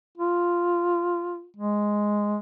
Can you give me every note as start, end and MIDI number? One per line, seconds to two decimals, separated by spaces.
0.18 1.44 65
1.56 2.37 56